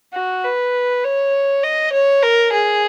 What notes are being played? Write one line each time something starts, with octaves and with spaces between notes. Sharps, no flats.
F#4
B4
C#5
D#5
C#5
A#4
G#4